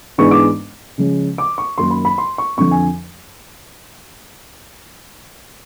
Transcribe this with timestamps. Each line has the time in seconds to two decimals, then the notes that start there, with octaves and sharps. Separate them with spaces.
0.18 G#2 E3 G#3 B3 D4 C#6
0.31 D6
0.98 C#3 F3 G#3 C#4
1.38 D6
1.58 C#6
1.78 F#2 D#3 F#3 A#3 D#4 C6
1.91 B5
2.05 B5
2.18 C6
2.38 C#6
2.57 F2 D3 F3 C#6
2.71 G#5